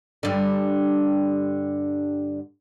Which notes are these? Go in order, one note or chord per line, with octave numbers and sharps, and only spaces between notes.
G2 D3